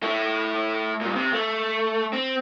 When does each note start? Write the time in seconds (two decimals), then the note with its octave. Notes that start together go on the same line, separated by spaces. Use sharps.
0.03 A3 E4
1.01 G2 A#2
1.16 C3
1.33 A3
2.13 C4